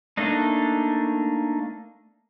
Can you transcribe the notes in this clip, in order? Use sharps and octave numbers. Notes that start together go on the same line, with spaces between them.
A3 A#3 D4 D#4